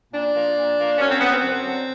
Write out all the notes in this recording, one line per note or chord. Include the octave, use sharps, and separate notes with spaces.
A#2 D4
F3 A#3
A#2
F3 A#3
F#2 C#4
C4
D3 F#3 B3
C4
F#2 C4
D3 F#3